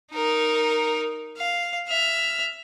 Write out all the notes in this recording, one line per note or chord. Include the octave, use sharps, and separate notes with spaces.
D#4 A#4
F5
E5 F6